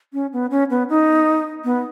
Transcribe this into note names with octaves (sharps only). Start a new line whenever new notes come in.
C#4
B3
C#4
B3
D#4
B3